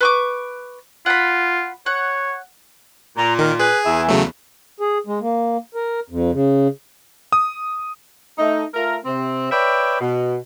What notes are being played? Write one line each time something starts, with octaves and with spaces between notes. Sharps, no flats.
B4 C#6 D6
F4 F#5 B5
C#5 F#5
A#2 A#5
D#3 A#4
G#4 B4 G#5
E2 E5
C#3 F#3 A3
G#4
G#3
A#3
A#4
F2
C#3
D#6
A3 D#4
A3 F4 A#4
C3 C4
B4 C#5 D5 E5 G5
B2